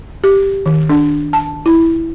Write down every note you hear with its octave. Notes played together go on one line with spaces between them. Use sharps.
G4
D#3
D4
A5
E4